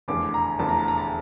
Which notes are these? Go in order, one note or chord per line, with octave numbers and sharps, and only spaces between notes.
F1 E2 D3 D6
A#5
F1 E2 D3 A5
A#5
A5
A#5
A5